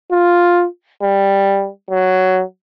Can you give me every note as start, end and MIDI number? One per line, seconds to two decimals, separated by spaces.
0.11 0.66 65
1.02 1.69 55
1.90 2.42 54